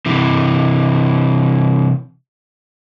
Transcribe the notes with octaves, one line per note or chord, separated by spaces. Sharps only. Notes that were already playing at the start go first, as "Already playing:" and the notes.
C3 E3